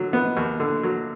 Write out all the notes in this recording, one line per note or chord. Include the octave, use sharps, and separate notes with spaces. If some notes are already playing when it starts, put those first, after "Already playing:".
Already playing: D3 F#3
B3
D#2
D3
F#3